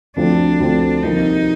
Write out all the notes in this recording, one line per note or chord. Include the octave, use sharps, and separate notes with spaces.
D2 D3 F3 C4 D4
D2 D3 F3 C4
C2 C3 F3 A#3 D#4